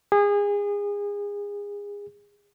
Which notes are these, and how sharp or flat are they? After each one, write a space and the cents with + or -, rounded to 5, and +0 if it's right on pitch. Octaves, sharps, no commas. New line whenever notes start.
G#4 -30